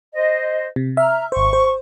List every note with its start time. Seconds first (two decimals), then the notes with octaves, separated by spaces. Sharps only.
0.14 C5 D#5
0.76 C3
0.97 E5 A#5 F6
1.32 G#1 C5 C#6
1.53 C5